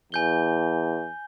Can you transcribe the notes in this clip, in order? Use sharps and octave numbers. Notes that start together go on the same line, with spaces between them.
E2 G#5 G6 G7